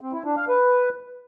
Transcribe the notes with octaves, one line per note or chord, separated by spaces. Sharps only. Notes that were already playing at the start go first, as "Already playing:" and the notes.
C4
E4
D4
F5
B4